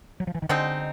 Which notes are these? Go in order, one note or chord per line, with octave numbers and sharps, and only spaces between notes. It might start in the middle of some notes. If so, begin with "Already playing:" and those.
F#3
F3
E3
D#3
B2 D3 G#3 C4 D#4